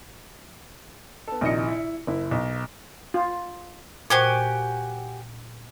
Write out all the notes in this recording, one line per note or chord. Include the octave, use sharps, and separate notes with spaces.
B3 A4
A#1 C3 D#3 E4 D#5 C#7
E4
F#1 E4
B1
F4
A#2 F#4 G4 C5 G#5 C#6